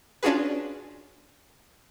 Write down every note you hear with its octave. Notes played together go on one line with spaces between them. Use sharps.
C#4 D4 F4 F#4 G#4 B4